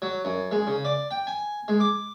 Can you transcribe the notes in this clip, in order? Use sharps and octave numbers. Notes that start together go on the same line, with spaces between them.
F#3
F#2
G#3
C#3
D5
G5
G#5
G#3
D6